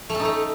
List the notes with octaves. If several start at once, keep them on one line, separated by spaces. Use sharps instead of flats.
A3
A4
D#4
A3